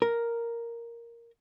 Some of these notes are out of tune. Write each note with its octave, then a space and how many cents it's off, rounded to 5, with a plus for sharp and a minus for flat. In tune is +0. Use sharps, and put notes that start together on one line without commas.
A#4 +0